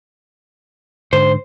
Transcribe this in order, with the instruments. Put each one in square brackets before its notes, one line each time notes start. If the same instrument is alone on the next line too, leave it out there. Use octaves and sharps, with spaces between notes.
[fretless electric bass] G#2 D3 [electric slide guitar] C5